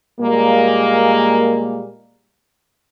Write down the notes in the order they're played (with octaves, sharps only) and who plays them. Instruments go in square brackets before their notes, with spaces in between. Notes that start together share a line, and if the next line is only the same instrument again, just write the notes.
[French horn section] A#2 G3 G#3 A#3